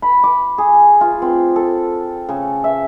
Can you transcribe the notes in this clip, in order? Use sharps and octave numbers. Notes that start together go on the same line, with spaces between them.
B5
D6
G#4
F4
C4
A4
C#3
E5